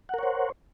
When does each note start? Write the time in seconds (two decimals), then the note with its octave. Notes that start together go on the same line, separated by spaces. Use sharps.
0.09 F#5
0.14 A#4
0.18 C#5
0.23 C5